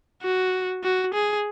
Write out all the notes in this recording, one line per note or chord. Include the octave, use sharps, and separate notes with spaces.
F#4
F#4
G#4